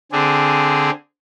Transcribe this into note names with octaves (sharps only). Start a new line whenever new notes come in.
D3 C4 D4 G#4